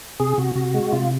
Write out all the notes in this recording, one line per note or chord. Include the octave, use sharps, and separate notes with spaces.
C3 G#4
C3 F#4
C3 F#4
G#3
C3 F4